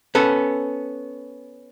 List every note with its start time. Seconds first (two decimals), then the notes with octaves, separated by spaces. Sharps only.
0.15 B3 C#4 A4